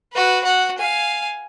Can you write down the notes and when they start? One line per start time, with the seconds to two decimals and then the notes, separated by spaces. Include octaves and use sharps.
0.13 F#4 B4
0.44 F#4 F#5
0.78 F5 G#5